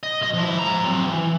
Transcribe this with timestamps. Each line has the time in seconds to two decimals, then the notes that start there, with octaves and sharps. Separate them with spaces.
0.03 D#5
0.21 B1 D#5
0.34 F3 E4
0.59 G#2 A#5
0.84 F#3 C4
1.07 E3